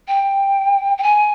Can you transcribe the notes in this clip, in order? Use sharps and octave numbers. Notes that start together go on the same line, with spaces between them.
G5
G5
G#5